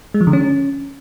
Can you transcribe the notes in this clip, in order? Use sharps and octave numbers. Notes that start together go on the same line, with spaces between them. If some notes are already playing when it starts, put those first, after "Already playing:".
G#3
F3
D3
C#4